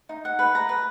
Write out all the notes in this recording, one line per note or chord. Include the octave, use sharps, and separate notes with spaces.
D#4
F#5
B4
A#5
B4